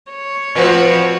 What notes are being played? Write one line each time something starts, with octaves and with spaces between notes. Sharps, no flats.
C#5
A2 F3 C4 F#4 B4